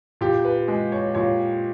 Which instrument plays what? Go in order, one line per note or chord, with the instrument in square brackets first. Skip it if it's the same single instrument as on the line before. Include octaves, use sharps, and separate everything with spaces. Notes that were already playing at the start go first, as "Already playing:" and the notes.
[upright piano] A#2 G4
B4
G#3
C#5
A#2 C#5